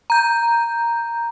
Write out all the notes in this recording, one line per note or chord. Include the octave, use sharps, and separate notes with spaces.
A#5 G6